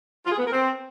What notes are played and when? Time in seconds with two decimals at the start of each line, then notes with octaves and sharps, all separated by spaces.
0.25 F4
0.32 G#4
0.38 B3
0.45 A#4
0.52 C4